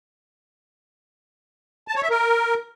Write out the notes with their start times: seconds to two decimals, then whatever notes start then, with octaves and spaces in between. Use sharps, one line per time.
1.88 A5
1.95 C#5
2.03 E5
2.10 A#4